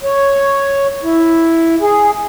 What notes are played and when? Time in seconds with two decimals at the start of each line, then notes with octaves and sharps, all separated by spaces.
0.03 C#5
1.03 E4
1.81 G#4